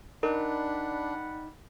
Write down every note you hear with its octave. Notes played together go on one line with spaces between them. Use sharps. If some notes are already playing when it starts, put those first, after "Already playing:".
G3 D4 D#4 A#4 F#5 B5